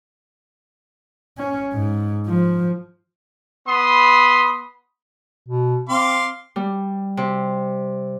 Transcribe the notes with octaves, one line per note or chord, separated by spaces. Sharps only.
C#4
G#2
F3
B3 B5 C6 D#6
B2
C4 F5 C6 D6
G3
C3